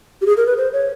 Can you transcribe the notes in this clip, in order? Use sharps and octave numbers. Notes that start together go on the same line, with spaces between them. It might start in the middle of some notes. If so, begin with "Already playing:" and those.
G4
G#4
A#4
B4
C5
C#5